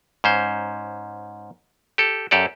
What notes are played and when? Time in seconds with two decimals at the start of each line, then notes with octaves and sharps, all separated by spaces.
0.24 G#2 C#4 C5
1.98 G4 A4
2.31 F#2 G4 A4 D5